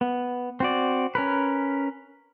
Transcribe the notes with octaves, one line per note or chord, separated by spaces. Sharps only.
B3
C4 F#4 D5
C#4 A#4 B4